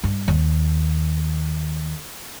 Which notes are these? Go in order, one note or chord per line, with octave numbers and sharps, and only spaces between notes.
G2
D#2